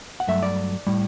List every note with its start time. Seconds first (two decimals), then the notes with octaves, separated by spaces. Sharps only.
0.20 F#5
0.28 G2 F#3 A3 E5
0.43 D5
0.87 A2 G3